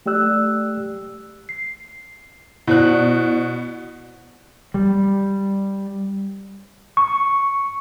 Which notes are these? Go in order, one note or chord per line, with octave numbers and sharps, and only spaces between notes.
A3 G4 D5 E6 F#6
C7
B2 E4 C5 D5 F#6
G3
C#6